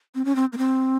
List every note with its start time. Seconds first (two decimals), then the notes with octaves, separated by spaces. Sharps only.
0.15 C4
0.25 C#4
0.36 C4
0.53 A#3
0.58 C4